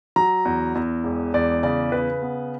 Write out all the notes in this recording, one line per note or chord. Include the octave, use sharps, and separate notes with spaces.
F#3 A#5
E2
E2
E1
E2 D5
C#3 D5
C#3 B4
B3